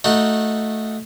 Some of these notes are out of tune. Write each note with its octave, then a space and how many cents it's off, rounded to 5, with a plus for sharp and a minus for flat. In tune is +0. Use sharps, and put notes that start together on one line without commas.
A3 +0 D#4 +0 F#4 -20